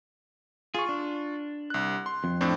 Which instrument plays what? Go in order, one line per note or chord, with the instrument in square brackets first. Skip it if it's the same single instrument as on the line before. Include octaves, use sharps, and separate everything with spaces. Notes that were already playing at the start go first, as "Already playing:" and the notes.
[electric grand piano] F4 C#6 [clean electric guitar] G#4
[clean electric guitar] D4
[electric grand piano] C2 F#6
C6
[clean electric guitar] F2
[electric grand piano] A2 C4 D4